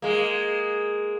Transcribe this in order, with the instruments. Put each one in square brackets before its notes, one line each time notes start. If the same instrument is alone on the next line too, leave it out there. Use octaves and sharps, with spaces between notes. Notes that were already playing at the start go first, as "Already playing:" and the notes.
[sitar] G#3 A#3